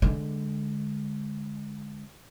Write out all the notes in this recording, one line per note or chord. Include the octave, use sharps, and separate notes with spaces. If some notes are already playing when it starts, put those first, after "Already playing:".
D3 G#3